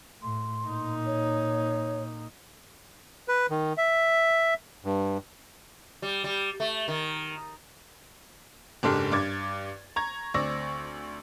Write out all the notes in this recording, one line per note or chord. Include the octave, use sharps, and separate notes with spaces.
A2 C6
A#2 D#4
C#5
B4
D#3
E5
G2
G3
G3
A3
D#3
F#1 G#2 D4 G4 A4 F6
G2 D6 G#6 A6
A#5 C#6 G#6
D2 C4 D5 C#6 E6 A#6